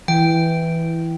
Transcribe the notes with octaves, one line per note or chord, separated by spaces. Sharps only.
E3 G5